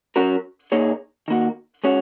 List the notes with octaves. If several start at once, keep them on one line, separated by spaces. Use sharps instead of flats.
F#3 C#4 F#4 A#4
A#2 A#3 D#4 G#4 C#5
D#3 A#3 F#4
G#3 C#4 F#4 C#5